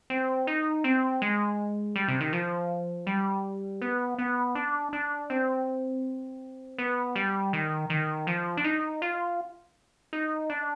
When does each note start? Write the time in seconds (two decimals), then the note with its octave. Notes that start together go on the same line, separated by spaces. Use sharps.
0.10 C4
0.47 D#4
0.84 C4
1.22 G#3
1.96 G3
2.08 C3
2.20 D#3
2.33 F3
3.07 G3
3.82 B3
4.19 B3
4.55 D4
4.93 D4
5.30 C4
6.78 B3
7.16 G3
7.53 D#3
7.90 D#3
8.27 F3
8.57 D4
8.64 D#4
9.02 F4
10.13 D#4
10.50 D4